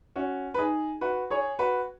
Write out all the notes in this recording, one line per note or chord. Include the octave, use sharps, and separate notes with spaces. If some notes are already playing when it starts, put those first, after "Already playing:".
C#4 F#4
B4
D#4 G#4
F#4 B4
G#4 C#5
F#4 B4